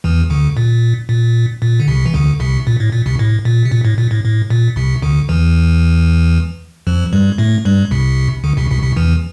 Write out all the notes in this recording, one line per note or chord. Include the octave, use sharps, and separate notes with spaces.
E2 E3
D2 D3
A#2
A#2
A#2
D3
C2 C3
E3
D2 D3
C2 C3
A#2
A2
A#2
C2 C3
A2
A#2
C3
A#2
A2
A#2
A2
A2
A#2
C2 C3
D2 D3
E2 E3
F2 F3
G2 G3
A2 A3
G2 G3
C2 C3
D2 D3
C2 C3
C2 C3
C2 C3
E2 E3